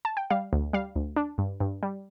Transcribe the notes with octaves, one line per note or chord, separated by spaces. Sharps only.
A5
G5
G3 F5
D2
G3 F5
D2
D4
G2
G2
G3